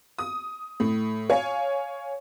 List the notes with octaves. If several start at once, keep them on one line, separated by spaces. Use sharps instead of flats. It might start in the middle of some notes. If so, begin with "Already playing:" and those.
D#6
A2
C#5 F5 G#5